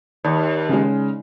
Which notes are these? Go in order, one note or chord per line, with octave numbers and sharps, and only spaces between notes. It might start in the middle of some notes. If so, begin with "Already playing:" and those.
D#2
C#3 G#3